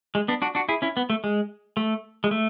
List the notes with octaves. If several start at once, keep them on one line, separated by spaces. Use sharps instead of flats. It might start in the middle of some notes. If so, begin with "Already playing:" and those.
G#3
B3 D4
D4 F#4
D4 F#4
E4 G#4
C#4 E4
B3
A3
G#3
A3
G#3
A3